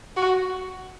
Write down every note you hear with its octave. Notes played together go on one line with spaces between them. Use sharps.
F#4